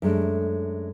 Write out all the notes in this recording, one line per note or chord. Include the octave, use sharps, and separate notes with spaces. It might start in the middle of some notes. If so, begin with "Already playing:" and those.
F#2 G#3 A3 D4